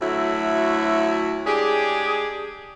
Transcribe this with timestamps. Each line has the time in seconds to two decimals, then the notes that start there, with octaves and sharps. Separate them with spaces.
0.01 D2 F#3 A3 E4 F#4
1.46 G#3 D4 G4 G#4